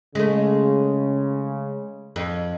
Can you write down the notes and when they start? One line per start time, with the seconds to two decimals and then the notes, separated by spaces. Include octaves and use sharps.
0.15 C#3 G#3 A3
2.16 F2